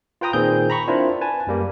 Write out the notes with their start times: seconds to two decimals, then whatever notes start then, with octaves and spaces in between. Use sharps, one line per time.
0.21 F4 B4 G5 A#5 D#6
0.33 A#2 D#3 C4 G#4 G6
0.70 A#5 B5 C#6
0.88 C4 D4 E4 F4 A#4 C5
1.21 B4 G#5 A5
1.47 F#2 G3 A#3